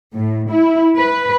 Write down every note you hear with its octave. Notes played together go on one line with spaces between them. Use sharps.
A2
E4
B4